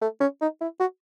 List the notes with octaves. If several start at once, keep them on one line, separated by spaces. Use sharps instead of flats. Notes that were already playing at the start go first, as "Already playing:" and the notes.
A3
C#4
D#4
E4
F#4